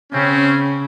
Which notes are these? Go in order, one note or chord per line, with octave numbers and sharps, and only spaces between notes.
C#3 C4 C#4